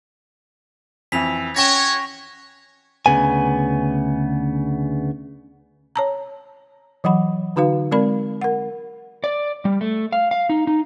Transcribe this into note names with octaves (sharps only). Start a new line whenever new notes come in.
F2 E3 B6 F7
C#4 F#4 C#5 G5 C#6 A#6 E7
D2 C#3 B3 G#5
C#5 A5 A#5
E3 F#3 F#5 B5
D3 D#4 F#4 B4 F5
G#3 C4 A#4 D5 B5
A#4 F#5
D5
G3
A3
F5
F5
D#4
D#4